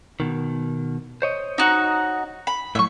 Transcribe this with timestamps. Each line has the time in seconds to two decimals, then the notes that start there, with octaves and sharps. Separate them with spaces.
0.20 B2 D#3
1.22 C5 C#5 D#5
1.58 D#4 F#4
2.47 B5
2.75 A2 F#3 E5 C#6